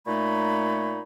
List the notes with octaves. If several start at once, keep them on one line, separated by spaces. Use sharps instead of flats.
A#2 A3 D#4 C#5 B5